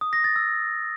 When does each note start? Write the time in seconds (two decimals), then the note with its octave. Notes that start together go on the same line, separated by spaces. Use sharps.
0.01 D#6
0.13 A#6
0.24 A6
0.36 E6